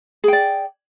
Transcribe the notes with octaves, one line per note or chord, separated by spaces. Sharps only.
G#4 D5 G5